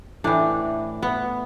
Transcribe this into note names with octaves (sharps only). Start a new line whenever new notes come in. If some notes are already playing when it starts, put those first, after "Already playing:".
A2 E3 D4
B3